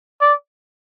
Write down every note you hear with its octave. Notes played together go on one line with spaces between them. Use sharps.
D5